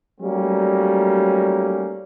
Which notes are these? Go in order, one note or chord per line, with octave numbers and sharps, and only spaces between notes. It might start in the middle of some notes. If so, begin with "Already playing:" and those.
F#3 G3 A3 A#3 C#4 D#4